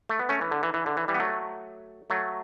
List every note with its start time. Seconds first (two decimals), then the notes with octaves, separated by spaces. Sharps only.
0.09 A3
0.19 B3
0.29 A3 C#4
0.41 E3
0.51 D3
0.63 E3
0.74 E3
0.86 D3
0.97 E3
1.08 E3 G3
1.14 B3
1.20 F#3 A3
2.10 F#3 A3